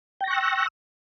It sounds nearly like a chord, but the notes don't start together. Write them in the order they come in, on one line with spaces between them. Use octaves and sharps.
G5 A#6 C#6 F#6 E6